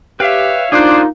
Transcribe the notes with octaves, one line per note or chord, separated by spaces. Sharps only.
G4 B4 C#5 E5 F5 G5
A#3 D4 D#4 F4 G#4 C5 D6 F#6